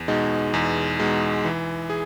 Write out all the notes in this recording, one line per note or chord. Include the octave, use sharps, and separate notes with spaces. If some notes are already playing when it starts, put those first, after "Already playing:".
Already playing: E2
B2 G#3 D#4
E2
B2 G#3 D#4
E3
G#4